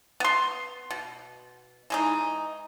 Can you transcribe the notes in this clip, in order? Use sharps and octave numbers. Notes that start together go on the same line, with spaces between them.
B3 C6
B2
E3 G#3 D#4